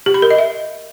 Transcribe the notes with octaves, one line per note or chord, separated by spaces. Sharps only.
G4
B5
A#4
D#5
E5